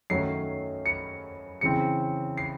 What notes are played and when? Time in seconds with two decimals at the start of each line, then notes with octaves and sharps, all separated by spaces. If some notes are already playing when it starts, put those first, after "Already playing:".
0.10 F#2 D#3 F#3 A3 C#4 C7
0.86 C#7
1.61 C#3 E3 C4 C#7
2.37 C7